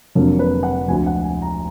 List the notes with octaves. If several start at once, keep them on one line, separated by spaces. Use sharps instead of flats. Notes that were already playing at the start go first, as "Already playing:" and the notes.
F1 F2 D3 F#3 A#3
B4
F#5
D2 D3 F3 G#5
F#5
G#5
A#5